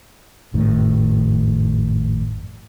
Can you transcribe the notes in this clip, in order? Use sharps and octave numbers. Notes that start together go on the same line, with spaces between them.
G#1 F2 A2 D#3